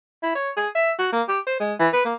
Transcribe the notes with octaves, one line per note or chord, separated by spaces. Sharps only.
E4
C#5
G#4
E5
F#4
A#3
G4
C5
G#3
E3
B4
A#3